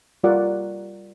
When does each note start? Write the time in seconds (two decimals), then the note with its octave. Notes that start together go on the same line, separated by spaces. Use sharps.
0.24 G3 F4 A#4 D5 F#5